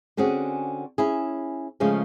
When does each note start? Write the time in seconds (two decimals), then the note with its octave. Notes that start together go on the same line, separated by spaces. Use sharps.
0.17 D3 C4 C#4 F#4 G#4
0.98 C#4 E4 G#4
1.80 C#3 F3 G#3 A3 C#4